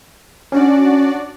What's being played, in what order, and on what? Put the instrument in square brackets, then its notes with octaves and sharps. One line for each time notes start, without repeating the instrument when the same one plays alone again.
[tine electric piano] C#4 [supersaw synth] D4 F#4 D5